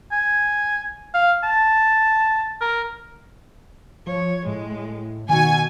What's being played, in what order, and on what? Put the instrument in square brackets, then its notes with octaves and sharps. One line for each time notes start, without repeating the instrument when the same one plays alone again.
[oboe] G#5
F5
A5
A#4
[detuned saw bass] F3 [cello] C#5
[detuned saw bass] A2 [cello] G#3
[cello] B2 F#4 [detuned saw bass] D#3 [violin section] G#5